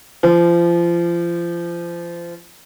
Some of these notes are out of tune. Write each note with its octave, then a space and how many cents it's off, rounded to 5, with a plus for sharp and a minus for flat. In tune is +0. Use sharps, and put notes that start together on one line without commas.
F3 -30